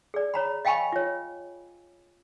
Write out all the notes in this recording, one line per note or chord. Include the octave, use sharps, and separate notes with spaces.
G#4 D5
C#5 A#5 B5
D#5 F5 G5 G#5 B5 C#6
F4 C#5